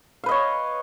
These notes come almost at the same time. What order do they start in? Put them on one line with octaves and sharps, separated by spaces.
F5 B4 D#5 C#5